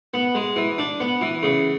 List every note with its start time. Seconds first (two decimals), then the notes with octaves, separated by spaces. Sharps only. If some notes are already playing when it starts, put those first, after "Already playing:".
0.14 B3
0.35 G#3
0.56 E3
0.78 D4
1.00 B3
1.21 E3
1.43 C#3